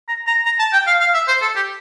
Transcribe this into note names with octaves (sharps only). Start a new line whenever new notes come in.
A#5
A#5
A#5
A5
G5
F5
F5
E5
C5
A4
G4